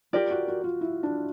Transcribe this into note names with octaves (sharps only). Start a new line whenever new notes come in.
F4 G4 A#4 D5
F#4
F#4
F4
E4
D4